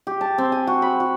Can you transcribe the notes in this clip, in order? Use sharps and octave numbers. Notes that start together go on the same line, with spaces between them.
G4
A5
C4
G#5
F#4
B5
F#4